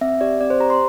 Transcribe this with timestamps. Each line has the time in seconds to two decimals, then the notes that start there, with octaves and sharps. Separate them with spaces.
0.01 C4 E5
0.21 G4 D5
0.41 C4 D5
0.50 C5
0.60 G4 A#5
0.70 C6